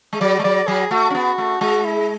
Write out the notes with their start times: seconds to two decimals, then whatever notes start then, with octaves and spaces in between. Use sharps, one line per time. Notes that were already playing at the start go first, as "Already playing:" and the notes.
0.13 G#3
0.21 F#3 D5
0.39 G#3
0.44 F#3 D5
0.68 F#3 G#4
0.91 A3 F#4
1.10 C#4
1.15 B3
1.38 A3
1.61 G#3 F#4
1.85 E4